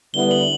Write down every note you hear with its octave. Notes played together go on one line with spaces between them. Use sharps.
D3 G3 B3 E4 G7
F#7